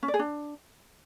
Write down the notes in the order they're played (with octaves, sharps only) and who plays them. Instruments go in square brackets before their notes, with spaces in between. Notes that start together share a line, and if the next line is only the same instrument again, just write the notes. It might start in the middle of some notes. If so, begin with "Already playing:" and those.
[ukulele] C#4
D5
G#4
D4